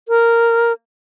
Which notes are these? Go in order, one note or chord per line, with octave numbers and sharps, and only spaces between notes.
A#4